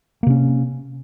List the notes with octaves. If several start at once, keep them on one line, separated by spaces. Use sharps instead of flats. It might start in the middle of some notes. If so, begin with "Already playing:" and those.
C3 A#3 C#4